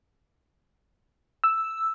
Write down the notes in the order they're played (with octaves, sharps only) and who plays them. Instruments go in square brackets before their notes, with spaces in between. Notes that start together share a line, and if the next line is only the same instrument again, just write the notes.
[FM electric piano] E6